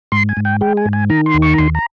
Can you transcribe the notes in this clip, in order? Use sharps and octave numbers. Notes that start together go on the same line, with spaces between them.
G#2 C6
G#5
G#2
G5
G#3 G5
G#5
G#2
G#5
D#3 A#5
C6
D#2
C#6
A#5
D#2 C6
A#5